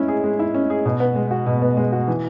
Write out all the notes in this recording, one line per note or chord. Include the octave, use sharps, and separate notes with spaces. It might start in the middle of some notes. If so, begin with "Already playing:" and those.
Already playing: G#3 C#4 E4
G#4
G#3
E4
C#4
G#4
B2
B3
G#3
F#4
B2
B3
G#3
F#4
E3